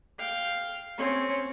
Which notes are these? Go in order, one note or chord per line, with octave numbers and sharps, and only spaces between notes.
F5 G5
C4 C#4